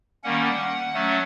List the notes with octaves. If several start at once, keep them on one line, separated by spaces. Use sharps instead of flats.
D#3 G3 A#3 C#4 F#5
F#3 A3 C#4